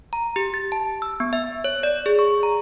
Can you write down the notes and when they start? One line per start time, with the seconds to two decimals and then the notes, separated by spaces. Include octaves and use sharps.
0.13 A#5
0.36 G4
0.54 A6
0.72 A5
1.02 E6
1.20 B3
1.33 E5
1.64 C#5
1.83 D5
2.06 G#4
2.19 C#6
2.43 A#5